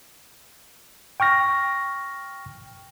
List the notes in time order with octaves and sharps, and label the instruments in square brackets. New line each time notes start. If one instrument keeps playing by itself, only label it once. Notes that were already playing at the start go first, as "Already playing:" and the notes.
[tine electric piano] G5 C#6 F6 A#6